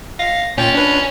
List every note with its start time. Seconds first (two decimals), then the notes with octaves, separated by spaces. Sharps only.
0.19 F5 A#6
0.57 A#2 C#4 G5 A6
0.75 D4 B4